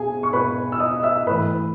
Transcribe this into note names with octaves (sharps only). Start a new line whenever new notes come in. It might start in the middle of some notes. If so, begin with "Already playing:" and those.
Already playing: B2 G#4 G#5
C#6
B2 B4 B5
E6
D#5 D#6
E5 E6
A2 E3 B4 B5